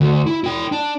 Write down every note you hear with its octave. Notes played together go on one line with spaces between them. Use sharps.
D2
E4
E4 G5
D4